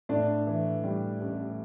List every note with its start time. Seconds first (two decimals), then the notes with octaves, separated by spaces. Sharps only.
0.09 A2 D4
0.47 E3
0.84 G3
1.21 A1